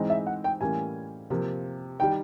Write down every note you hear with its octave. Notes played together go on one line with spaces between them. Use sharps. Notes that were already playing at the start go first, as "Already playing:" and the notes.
Already playing: G#2 E3 G#3 C4 D#4
E5
F#5
G5
A2 E3 G3 A#3 C#4 G#5
C3 F3 A#3
D#3 G3 G5